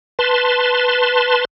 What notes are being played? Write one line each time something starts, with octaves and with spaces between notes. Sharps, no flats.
B4 A5 C6